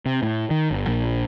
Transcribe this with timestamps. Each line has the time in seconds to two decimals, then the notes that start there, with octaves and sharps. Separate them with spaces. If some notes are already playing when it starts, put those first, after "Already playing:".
0.06 C3
0.23 A2
0.51 D#3
0.71 G1
0.87 A#1